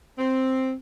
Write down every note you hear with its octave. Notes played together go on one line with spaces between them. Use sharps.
C4